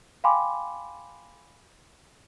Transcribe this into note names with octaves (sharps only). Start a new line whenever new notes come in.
F5 G5 G#5 B5 C6 D6